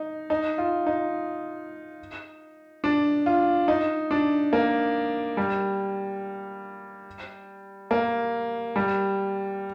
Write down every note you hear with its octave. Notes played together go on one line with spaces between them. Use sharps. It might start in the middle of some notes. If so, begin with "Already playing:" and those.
Already playing: D#4
D#4
F4
D#4
D4
F4
D#4
D4
A#3
G3
A#3
G3